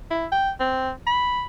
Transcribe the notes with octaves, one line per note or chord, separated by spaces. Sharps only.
E4
G5
C4
B5